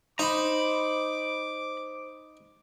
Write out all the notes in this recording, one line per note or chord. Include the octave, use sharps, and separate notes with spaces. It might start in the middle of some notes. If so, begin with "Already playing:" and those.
D#4 C5 A#5 B5 D6